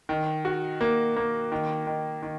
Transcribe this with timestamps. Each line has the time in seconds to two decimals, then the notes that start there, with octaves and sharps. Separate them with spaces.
0.09 D#3
0.45 F#4
0.81 A#3
1.16 A#3
1.52 D#3
1.87 D#3
2.22 D#3